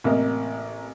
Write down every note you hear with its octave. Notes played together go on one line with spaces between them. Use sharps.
A1 C3 A#3 A#4 D#5